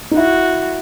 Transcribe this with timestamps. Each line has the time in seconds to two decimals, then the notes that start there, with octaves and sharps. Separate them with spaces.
0.11 D#4
0.17 E4 F#4